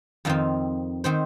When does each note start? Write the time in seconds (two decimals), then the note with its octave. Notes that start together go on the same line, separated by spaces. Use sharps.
0.25 F2 D#3 C4 F5
1.04 D#3 C4 C5